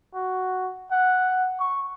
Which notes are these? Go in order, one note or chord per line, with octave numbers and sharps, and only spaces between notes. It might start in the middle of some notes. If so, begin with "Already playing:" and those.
F#4
F#5
C#6